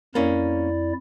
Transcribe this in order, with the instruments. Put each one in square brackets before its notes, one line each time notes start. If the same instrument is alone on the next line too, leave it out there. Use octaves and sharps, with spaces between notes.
[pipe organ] F2 E4 D5 [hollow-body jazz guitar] A#3 C#4